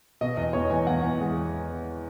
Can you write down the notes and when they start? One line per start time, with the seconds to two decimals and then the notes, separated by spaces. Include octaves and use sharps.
0.21 B2 D#5
0.37 E2 D#5
0.53 E2 C#5
0.70 E2 G#5
0.87 E2 F#5
1.03 E2
1.20 G#3